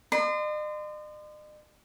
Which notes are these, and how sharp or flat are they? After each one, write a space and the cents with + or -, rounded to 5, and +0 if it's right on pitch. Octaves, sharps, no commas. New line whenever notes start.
D#5 -45 C6 -30